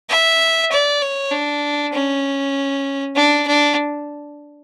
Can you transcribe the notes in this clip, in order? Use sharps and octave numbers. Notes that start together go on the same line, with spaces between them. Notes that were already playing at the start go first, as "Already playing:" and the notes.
E5
D5
C#5
D4
C#4
D4
D4